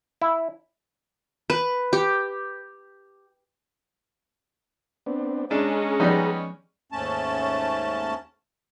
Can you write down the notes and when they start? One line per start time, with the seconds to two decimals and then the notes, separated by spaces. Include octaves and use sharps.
0.22 E4
1.50 B4
1.93 G4
5.06 B3 C4 D4
5.51 G#3 C#4 D4 G#4 A#5
6.00 F3 G3 B3 D#4 D5
6.92 D#2 G#2 A3 C#4 A5